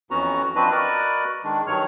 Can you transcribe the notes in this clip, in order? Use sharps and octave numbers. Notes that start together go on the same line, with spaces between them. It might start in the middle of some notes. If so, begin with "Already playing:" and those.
F2 E3 B3 C#4 F#4 A#5
F3 C4 D4 F#4 B4 D#5
F#4 A#4 B4 D5 D#5
D#3 G#3 D4
G2 D#3 F#3 C#5 F6